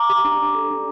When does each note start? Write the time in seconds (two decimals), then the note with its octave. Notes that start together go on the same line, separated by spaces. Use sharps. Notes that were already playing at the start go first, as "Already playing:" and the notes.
Already playing: A#5 D6
0.10 G4
0.25 D4
0.39 G4
0.55 A4
0.71 D4